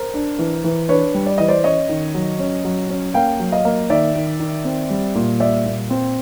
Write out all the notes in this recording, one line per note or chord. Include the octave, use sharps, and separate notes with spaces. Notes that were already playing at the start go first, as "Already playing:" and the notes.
Already playing: A#4 C5
D4
E3
E3
D4 B4 C#5
G3
D5
E3 D#5
C5 D5
C#4 C#5 D#5
D#3
F#3
C#4
F#3
C#4
A#3 F5 G5
F#3
D#5 F5
A#3
D#3 D5 E5
D#3
D#3
C4
G3
A#2
G3 D5 E5
A#2
C4